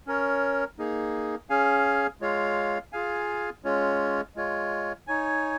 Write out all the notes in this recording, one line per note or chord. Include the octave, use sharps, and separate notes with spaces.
C#4 A#4 C#5
A#3 D#4 G#4
C#4 G#4 F5 G#5
G#3 F4 C#5 F5
F4 G#4 F5 G#5
G#3 C#4 F4 C#5
G#3 F4 C#5
D#4 C#5 G#5